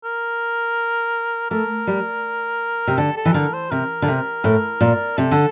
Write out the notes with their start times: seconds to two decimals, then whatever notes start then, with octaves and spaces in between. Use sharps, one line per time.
0.04 A#4
1.51 A3 A#4
1.87 G3
2.87 C3
2.98 D3 A4
3.17 A4
3.25 E3
3.34 D3 A#4
3.53 C5
3.71 C3 A#4
4.02 D3
4.08 C3
4.44 A2
4.80 A#2
5.18 C3 A4
5.31 D3